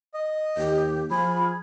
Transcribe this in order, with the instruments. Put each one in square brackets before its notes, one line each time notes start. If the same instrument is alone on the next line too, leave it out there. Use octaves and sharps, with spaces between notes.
[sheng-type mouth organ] D#5
[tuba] D#2 [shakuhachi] G4
[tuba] F3 [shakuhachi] F4 [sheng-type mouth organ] G#4 [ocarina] B5